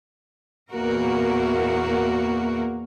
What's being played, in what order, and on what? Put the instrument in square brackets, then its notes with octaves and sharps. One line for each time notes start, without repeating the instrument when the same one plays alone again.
[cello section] E2 A#2 A#3 F#4 A#4